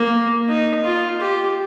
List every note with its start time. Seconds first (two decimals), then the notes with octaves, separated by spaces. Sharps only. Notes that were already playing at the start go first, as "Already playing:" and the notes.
Already playing: A#3
0.48 D#4
0.84 F4
1.21 G4